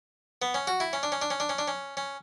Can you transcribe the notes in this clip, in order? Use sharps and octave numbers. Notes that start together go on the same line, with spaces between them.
B3
C#4
F#4
E4
C#4
D4
C#4
D4
C#4
D4
C#4
D4
C#4
C#4